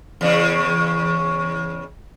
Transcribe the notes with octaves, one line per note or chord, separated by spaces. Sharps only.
E2 C#3